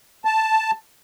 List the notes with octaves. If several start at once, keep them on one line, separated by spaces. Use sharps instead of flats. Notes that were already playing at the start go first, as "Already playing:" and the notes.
A5